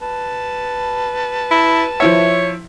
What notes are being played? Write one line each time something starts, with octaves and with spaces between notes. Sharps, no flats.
B4 A5
E4
F3 E4 C#5 E5